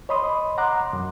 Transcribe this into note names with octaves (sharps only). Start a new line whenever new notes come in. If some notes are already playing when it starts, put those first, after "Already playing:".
C#5 D#5 B5 C6 D#6
F#5 A#5 C6 D6 F#6
F#2